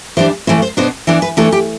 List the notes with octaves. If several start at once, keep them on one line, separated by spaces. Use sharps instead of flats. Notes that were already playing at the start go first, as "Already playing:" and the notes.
E3 G3 D4 C5
A2 E3 A3 C5
C5
B2 B3 D4 C5
E3 B3 D4 C5
B4
E3 A3 D4 A4
G4